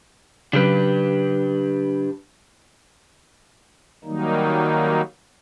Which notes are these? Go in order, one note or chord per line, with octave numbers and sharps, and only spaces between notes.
C#3 F#3 D4 G4 B4
D#3 F#3 G3 A#3 D#4